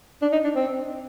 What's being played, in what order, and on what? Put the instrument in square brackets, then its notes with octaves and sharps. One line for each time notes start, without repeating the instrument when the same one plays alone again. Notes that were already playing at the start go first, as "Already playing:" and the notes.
[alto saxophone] D4
D#4
D4
C4